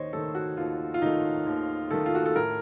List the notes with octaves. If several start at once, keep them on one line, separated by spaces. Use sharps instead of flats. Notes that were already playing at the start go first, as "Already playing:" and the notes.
Already playing: D#2 D#3 C5 C#5 D#5
D#3 A3 A4
F#4
D#2 F4
F4
D#3 A3 D#4
D#2
D#3 A3 A4
F4
F#4
A4
A2 A#4